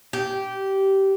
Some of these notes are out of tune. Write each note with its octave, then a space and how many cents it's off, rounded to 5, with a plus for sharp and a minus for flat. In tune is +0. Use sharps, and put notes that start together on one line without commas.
G4 -15